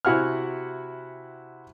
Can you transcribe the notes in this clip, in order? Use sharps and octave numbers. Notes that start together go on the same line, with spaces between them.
C3 E4 F#4 F#5 G#5 F6